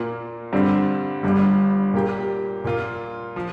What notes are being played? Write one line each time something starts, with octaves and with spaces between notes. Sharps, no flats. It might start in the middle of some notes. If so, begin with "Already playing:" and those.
Already playing: A#2 A#3 F4
G2 D3 G3 C4
G1 G2 G3
A#2 A#3 G4
A#2 A#3 F4
F3